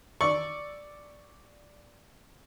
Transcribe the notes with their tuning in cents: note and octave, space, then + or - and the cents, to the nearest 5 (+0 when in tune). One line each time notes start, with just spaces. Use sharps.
D5 +0 C#6 +0 E6 +0